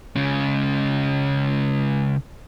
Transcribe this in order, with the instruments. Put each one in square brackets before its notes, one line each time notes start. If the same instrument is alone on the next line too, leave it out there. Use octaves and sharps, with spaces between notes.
[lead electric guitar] C#3 G#3